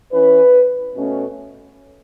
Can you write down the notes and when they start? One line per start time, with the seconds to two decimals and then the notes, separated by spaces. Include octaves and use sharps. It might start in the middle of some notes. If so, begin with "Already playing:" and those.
0.12 E3 C#4 B4
0.95 B2 A3 C#4